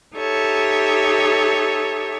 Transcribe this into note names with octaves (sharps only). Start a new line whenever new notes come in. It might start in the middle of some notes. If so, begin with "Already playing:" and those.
D#4 G4 A4 C#5 E5